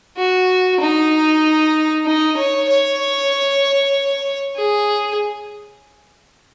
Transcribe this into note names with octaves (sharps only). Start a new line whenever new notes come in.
F#4
D#4
D#4
C#5
C#5
G#4